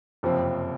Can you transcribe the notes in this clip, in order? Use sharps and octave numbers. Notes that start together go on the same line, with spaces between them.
F#1 F2 C3 F3 C4